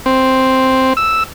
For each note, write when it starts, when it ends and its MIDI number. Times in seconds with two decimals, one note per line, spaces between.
0.06 0.93 60
0.97 1.23 88